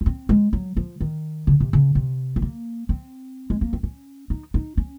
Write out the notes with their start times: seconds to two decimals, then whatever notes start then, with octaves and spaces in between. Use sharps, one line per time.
0.01 C#4
0.06 C4
0.29 G#3
0.53 F#3
0.77 F3
1.01 D#3
1.47 C#3
1.60 C3
1.73 C#3
1.95 C3
2.36 C4
2.42 A#3
2.89 C4
3.50 G#3
3.61 A#3
3.73 C4
3.83 C#4
4.30 D#4
4.54 D#4
4.77 C#4